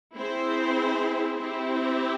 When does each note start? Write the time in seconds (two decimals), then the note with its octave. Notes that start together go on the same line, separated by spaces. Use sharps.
0.17 C4 E4 G#4 C5
1.39 C4 E4 G4